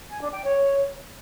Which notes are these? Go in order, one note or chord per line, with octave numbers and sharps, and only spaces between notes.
G#5
D4
G5
C#5